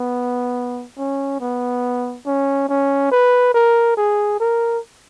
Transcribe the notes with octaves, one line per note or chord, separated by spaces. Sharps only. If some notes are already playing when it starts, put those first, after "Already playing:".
Already playing: B3
C#4
B3
C#4
C#4
B4
A#4
G#4
A#4